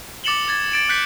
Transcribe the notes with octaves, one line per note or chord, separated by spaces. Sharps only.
D6 A6 C#7 E7 F#7 G7
D6 G#6 A6
A6 D7 E7
F#6 G6 B6 C#7